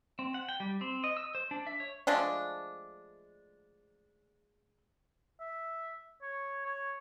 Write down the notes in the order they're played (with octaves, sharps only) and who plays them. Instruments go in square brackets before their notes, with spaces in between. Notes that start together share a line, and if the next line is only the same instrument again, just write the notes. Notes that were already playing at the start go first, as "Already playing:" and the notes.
[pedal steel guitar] C4
F#5
G5
G3
C4
D#5
E6
C5
D4
E5
C#5
[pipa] F3 G#3 A3 D4
[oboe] E5
C#5
C#5